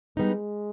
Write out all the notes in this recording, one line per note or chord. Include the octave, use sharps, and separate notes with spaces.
G3 G#3 B3 D#4